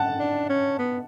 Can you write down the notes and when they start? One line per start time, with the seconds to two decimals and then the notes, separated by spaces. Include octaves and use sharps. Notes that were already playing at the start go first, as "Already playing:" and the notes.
Already playing: F#5 A5
0.19 D4
0.49 C#4
0.79 B3